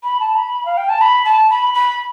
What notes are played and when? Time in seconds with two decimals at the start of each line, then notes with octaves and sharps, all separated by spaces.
0.03 B5
0.20 A5
0.35 B5
0.66 F5
0.77 G5
0.89 A5
1.01 B5
1.25 A5
1.50 B5
1.74 B5